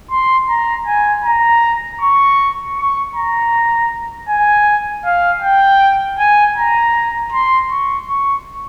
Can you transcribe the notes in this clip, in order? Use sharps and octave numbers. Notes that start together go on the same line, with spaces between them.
C6
A#5
G#5
A#5
C#6
C#6
A#5
G#5
F5
G5
G#5
A#5
C6
C#6
C#6